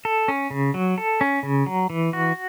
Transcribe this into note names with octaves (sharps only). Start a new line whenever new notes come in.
A4
C#4
C#3
F#3
A4
C#4
C#3
F#3
E3
F#4